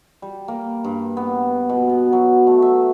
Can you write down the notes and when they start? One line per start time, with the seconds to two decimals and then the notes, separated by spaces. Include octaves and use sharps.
0.22 G3
0.48 A#3
0.84 G2
1.17 B3
1.69 B2
1.89 B3
2.13 F#3
2.47 A3
2.62 E5